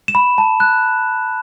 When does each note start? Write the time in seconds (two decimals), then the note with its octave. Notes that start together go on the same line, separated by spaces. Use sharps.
0.08 E7
0.15 B5
0.38 A5
0.60 F#6